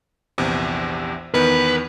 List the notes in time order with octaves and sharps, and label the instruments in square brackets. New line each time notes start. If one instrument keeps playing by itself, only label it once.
[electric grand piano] A#1 E2 C3
[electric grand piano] E2 D#3 B3 [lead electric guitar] B4